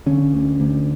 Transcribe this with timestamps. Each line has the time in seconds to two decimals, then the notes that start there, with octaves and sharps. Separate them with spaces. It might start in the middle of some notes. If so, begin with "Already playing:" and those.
0.06 D3 C#4
0.33 D2
0.60 D2